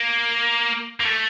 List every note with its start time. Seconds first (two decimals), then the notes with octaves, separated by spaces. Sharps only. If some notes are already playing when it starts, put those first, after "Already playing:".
Already playing: A#3
1.00 A#3
1.05 A3